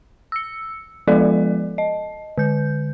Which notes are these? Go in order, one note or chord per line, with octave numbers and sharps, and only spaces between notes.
E6 C#7
F3 G#3 F4 A4 D5
D#5
D3 G6